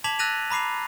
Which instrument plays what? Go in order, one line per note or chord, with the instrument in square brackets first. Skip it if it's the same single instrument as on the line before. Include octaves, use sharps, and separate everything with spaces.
[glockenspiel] A5 D6 G#6 B6 F7 F#7
E6 F#6 A6 A#6 D#7 F7
A#5 B5 D6 C7 F7